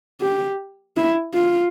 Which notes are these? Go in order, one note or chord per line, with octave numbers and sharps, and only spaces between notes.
G4
E4
F4